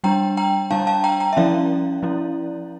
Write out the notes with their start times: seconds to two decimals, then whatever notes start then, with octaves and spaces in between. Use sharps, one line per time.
0.04 G3 D4 G5 A#5
0.37 G5 A#5
0.71 G3 D4 F5 A5
0.87 F5 A5
1.04 G5 A#5
1.20 G5 A#5
1.33 E5
1.37 F3 C#4 E4 D5 F5
2.03 F3 C#4 E4